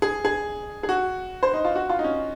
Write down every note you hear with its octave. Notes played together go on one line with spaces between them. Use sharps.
G#4
G#4
G#4
F#4
C5
D#4
F4
F#4
F4
D#4
C#4